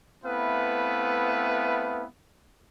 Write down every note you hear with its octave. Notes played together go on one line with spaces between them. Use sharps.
A3 B3 C4 E4 B4 F5